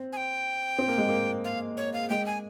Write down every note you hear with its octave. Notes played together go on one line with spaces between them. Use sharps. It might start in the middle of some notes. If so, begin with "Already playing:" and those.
Already playing: C4
G#5
G5
C4
A#3
G#3
A#3
F5
C#5
F5
G#3 G5
G#5